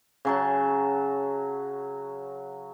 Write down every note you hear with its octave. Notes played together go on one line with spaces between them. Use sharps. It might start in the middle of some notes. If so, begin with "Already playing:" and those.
C#3 F#3 A5